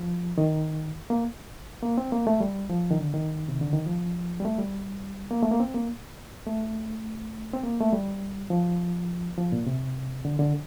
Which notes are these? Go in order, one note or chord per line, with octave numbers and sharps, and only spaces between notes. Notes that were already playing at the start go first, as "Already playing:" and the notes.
Already playing: F3
D#3
A#3
A#3
C4
A#3
A3
G3
F3
D#3
D3
D#3
C3
D3
D#3
F3
G3
A3
G3
A#3
A3
A#3
C4
A#3
A3
C4
A#3
A3
G3
F3
F3
A#2
C3
D3
D3